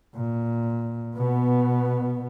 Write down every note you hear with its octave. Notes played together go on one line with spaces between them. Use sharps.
A#2
B2 B3